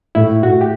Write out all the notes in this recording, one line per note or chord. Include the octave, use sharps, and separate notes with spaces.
A2 E4
A2 F#4
G4